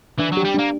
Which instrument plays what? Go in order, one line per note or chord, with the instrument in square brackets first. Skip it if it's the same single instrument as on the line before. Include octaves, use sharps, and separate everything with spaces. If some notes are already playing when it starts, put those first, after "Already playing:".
[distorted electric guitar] E3 [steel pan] D4
[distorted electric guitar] F#3
[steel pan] G4
[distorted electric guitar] G3
[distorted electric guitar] A#3 [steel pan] D4